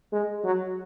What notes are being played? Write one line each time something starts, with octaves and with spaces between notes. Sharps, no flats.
G#3
F#3